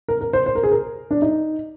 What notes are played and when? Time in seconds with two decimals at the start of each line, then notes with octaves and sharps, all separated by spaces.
0.08 A#4
0.21 A#4
0.33 C5
0.46 C5
0.55 A#4
0.63 G#4
0.71 A#4
1.11 D4
1.22 D#4